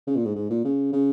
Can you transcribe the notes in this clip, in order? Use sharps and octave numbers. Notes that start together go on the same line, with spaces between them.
C#3
A#2
G#2
G#2
A#2
C#3
C#3